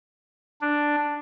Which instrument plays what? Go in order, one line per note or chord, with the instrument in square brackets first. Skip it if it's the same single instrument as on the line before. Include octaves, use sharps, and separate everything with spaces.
[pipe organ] D4